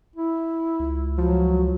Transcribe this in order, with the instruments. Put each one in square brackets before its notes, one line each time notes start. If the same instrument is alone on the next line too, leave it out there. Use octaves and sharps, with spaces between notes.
[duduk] E4
[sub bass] C#2 [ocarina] F4
[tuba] F3 [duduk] F#3 [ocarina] F#4